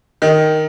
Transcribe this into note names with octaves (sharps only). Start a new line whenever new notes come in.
D#3